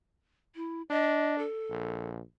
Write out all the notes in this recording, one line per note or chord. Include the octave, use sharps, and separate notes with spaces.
E4
D4 D#5
A4
A#1